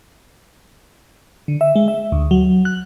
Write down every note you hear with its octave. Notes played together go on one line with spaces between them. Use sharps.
D3
E5
G#3
E5
D2
F#3
F#6